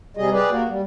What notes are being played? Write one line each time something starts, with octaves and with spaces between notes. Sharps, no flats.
C3 G3 G#4 D#5
G4 G#4 B4 D5
A#3 F#4
G3